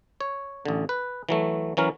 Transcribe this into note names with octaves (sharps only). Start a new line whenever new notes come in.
C#5
A1 D3
B4
E3 F#3 A3
E3 F#3 C#4 A#4